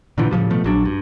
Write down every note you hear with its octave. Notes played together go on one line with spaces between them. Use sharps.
A#2 D3 E3 F3
A2 C#3 F3 G3
B2 F3 A3
A#1 F#3 D4
G2